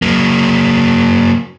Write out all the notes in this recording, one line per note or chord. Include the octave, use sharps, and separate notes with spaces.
F#3 A#3